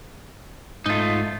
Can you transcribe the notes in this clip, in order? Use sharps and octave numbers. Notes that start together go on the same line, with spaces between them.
G#2 A3 D#4 F4